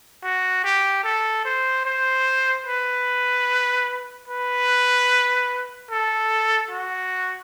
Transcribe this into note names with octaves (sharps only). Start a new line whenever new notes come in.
F#4
G4
A4
C5
C5
B4
B4
A4
F#4